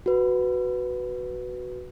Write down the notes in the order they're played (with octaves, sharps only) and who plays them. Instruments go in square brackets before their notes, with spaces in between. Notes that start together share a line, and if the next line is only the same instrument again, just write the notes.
[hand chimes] F#4 B4